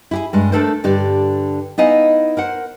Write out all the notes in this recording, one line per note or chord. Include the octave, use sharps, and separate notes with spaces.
E4 G4 G#4
G2 G#3
A3 A#3 D4 A4 A#4 C5
G2 D3 G4 D5
B3 D#4 E4 D#5 F5 G#5
A#4 C5 F#5